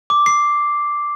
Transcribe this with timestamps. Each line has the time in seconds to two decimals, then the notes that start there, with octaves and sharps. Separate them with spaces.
0.10 D6
0.26 C7